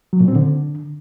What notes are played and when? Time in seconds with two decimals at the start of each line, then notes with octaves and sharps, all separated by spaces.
0.13 F#3
0.20 A#2
0.28 C4
0.36 D3